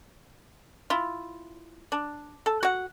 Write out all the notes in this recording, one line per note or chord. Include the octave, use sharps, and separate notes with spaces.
E4 F4
D4
A4
F#4 F#5